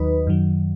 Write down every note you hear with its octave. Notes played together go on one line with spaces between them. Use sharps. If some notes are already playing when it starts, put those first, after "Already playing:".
Already playing: D#2 D#3 F#3 D#4 B4
F#2 D#3 F#3